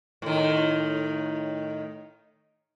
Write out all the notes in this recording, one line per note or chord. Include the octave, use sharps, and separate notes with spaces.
A2 D#3